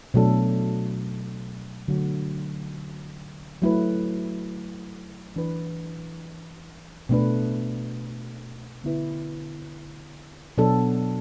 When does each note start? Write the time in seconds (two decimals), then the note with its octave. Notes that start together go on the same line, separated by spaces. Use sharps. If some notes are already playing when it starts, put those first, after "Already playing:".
0.14 B2 F#3 A3 D4 A4
1.88 D3 F#3 A3 F#4
3.62 F#3 A3 E4 B4
5.36 E3 D4 B4
7.09 B2 A3 D4 B4
8.84 D3 B3 E4 B4
10.58 B2 F#3 B3 D4 A4